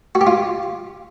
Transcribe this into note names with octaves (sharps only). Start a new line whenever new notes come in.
F#4
G4
F4